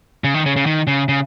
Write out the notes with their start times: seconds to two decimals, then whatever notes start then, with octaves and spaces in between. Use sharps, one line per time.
0.24 C#3
0.34 D#3
0.46 C#3
0.56 C#3
0.66 D#3
0.87 C#3
1.09 C#3